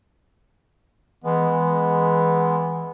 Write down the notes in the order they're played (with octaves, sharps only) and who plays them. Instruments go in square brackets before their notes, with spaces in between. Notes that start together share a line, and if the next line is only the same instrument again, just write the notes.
[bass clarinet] E3 [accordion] G#3 B3